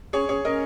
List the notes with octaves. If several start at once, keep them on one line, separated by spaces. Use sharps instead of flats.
C#4 G#4 C#5
C#4 G#4 C#5
C#4 A#4 D#5